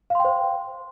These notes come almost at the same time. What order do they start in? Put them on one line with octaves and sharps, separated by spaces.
F5 C6 G5 C5